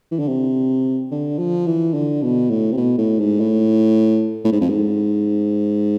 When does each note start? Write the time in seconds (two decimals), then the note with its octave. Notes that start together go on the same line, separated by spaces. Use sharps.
0.11 E3
0.19 D3
0.27 C3
1.11 D3
1.38 F3
1.66 E3
1.94 D3
2.22 B2
2.50 A2
2.72 C3
2.77 B2
2.98 A2
3.19 G#2
3.40 A2
4.44 A2
4.52 G#2
4.61 F2
4.69 G#2